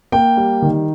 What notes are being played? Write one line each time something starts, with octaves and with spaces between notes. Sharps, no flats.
A#3 G5
G3
D#3